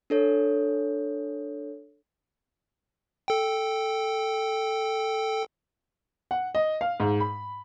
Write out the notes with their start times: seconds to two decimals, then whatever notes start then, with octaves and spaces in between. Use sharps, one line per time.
0.10 D4 A4 C#5
3.28 A4 G5
6.31 F#5
6.55 D#5
6.81 F5
7.00 G#2
7.20 B5